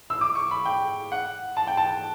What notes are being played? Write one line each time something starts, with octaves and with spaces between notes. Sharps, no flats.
E6
D6
C#6
B5
G5
F#5
A5
G5
A5